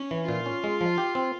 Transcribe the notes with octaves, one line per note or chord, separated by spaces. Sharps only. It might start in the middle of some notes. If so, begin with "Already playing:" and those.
Already playing: C#4
E3
A#2 F4
C#4
G#3
F3
G4
C4